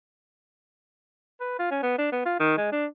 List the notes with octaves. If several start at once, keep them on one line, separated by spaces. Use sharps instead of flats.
B4
F4
C#4
B3
D4
B3
F4
D#3
G#3
D4